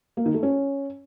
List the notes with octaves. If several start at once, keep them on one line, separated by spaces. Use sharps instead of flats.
A#3
D#3
A3
C#4